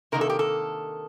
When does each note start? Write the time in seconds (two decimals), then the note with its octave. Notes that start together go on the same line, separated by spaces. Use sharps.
0.12 C3 D#3 A#3 D4 A#4
0.21 A4
0.30 G4
0.39 A4